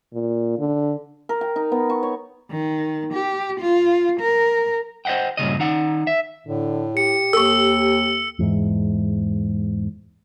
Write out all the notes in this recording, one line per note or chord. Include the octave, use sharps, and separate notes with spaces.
A#2
D3
A#4
G5
D#4
B3
C#6
C#5
D#3
G4
F4
A#4
C5 D#5 E5 F#5 G5
G2 A#2 C#3 D#5
D#3 D#4 F#5
E5
A2 D3
G4 C#7
D#2 A4 C#6 E6
E2 G#2